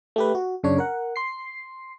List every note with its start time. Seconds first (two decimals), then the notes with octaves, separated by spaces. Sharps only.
0.16 A3 G4 B4
0.35 F#4
0.63 F#2 C#3 D4 C#5
0.78 A#4 F#5
1.16 C6 C7